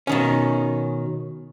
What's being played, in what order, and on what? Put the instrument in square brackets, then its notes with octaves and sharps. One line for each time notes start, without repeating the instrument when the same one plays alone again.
[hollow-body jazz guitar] B2 D#3 C#4